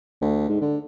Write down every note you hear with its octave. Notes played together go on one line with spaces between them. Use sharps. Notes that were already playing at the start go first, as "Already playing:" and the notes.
D2
G#2
D3